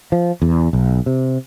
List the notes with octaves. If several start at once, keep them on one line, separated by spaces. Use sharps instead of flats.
F3
E2
B1
C3